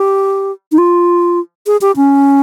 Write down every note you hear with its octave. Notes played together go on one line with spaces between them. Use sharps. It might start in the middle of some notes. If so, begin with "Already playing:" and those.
Already playing: G4
D#4
F4
G#4
G4
C#4